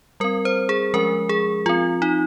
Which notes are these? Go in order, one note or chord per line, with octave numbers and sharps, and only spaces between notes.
G3 C4 A#4
C5
G#4
F3 G#3 C#4 A#4
G#4
F3 C4 F4
D#4